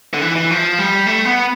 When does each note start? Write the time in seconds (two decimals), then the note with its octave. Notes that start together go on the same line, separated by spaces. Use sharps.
0.14 D3
0.22 E3
0.36 E3
0.51 F3
0.79 G3
1.07 A3
1.25 B3